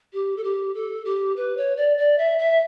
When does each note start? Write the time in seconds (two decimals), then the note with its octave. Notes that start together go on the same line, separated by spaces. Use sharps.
0.13 G4
0.36 A4
0.44 G4
0.74 A4
1.05 G4
1.36 B4
1.57 C#5
1.77 D5
1.98 D5
2.18 E5
2.38 E5